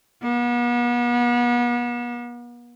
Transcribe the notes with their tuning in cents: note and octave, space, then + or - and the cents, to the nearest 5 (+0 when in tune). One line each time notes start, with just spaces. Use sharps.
B3 -40